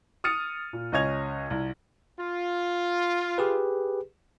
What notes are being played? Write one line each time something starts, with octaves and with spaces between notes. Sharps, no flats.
D#6 F6 A6 C#7 D#7
A#2
C#2 C#4 D#5 C#6 G#6 F7
C2
F4
G4 G#4 B4